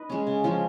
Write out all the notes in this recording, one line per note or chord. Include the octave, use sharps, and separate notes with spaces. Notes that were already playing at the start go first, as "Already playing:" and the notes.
Already playing: D#4 B4 D#5
G#3 C#4
C#3
F3 G#3 C#4